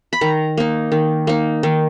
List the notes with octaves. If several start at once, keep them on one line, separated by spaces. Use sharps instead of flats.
B5
D#3 A#5
A#3 D#4
D#3
A#3 D#4
D#3